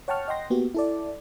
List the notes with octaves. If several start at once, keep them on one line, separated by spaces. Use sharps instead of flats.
C#5 F#5 G5 A5 C#6 F6
D#5 F#5 G5 C6 A#6
A#3 B3 F#4 G4
E4 A4 D5